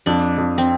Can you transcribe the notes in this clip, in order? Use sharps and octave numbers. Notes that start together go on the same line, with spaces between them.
F2 D4
F2
C4